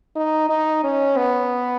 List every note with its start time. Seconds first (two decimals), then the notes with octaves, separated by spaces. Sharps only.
0.16 D#4
0.50 D#4
0.84 C#4
1.17 B3